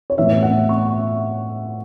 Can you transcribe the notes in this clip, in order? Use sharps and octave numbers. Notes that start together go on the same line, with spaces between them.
C#5
A2 E3 B3 E5
F#5
C#6